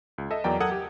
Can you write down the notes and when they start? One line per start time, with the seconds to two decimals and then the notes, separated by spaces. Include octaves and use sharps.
0.18 C#2
0.31 A4 D#5 E5
0.44 E2 F#3 A#4 D5 G5 A#5
0.60 A4 A#4 F#5 D#6 G#6
0.72 G4